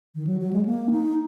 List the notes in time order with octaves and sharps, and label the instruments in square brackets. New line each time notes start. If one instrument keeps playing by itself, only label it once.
[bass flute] D#3
F#3
F#3
G#3
A#3
D#4